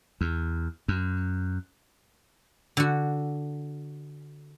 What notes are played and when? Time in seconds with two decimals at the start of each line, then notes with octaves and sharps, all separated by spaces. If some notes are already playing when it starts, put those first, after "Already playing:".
0.21 E2
0.88 F#2
2.77 D3 F#4